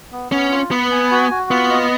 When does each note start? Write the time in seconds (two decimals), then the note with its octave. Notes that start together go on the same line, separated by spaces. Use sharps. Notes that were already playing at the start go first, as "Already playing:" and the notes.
0.12 B3
0.32 B3 C#4
0.51 F4
0.71 B3 B4
0.92 G#5
1.11 F#4
1.31 F#4
1.50 B3 F4
1.70 D#5